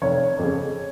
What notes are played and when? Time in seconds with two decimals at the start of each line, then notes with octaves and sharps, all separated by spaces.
0.02 F1 C#5
0.39 F2 C#3